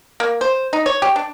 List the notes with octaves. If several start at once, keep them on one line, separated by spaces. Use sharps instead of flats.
A#3
C5
D#4
C#5
G4
D4